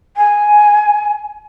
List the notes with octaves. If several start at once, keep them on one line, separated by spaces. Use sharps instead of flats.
G#5